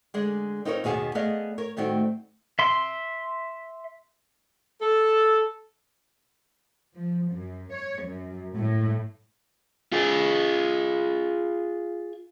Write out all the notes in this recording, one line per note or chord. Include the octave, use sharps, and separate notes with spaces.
D3 G#3 G#4
C4 D#4 F4 A#4 B4 C#5
D#2 B2 G#4 F5 F#5 A5
A3 B3 G#4 D5 D#5 F5
A#4 C#5
A2 D#3 G3 A3 C4 F#4
E5 C6
A4
F3
F#2
C#5
F#2
A2
F4 G#4